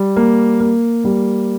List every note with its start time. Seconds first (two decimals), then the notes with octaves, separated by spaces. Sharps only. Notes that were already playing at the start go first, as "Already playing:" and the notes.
Already playing: G3
0.16 A#3
0.60 A#3
1.04 G3